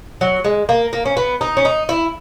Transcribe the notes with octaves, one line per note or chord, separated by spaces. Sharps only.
F#3
G#3
A#3
A#3
C#4
B3
D#4
C#4
D#4
E4